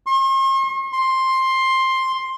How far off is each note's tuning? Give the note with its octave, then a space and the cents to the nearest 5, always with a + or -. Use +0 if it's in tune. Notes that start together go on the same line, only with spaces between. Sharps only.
C6 +45
C6 +10